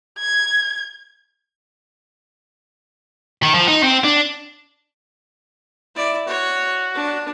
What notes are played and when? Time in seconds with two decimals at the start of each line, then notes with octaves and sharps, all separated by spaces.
0.19 G#6
3.43 D#3
3.54 F3
3.68 D#4
3.83 C4
4.04 D4
5.95 E4 D5
6.28 F#4 C#5
6.95 D4